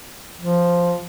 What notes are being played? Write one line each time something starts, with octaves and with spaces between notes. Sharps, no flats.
F3